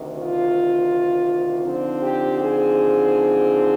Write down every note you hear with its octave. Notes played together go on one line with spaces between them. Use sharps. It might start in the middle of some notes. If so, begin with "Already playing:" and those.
Already playing: D2 C3 D#3
F4
D3 F3 C4 D#4
G4
G#4